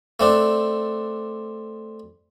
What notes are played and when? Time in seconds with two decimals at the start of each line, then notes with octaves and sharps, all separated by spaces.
0.20 A3 C4 D4